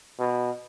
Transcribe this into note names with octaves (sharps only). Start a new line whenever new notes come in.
B2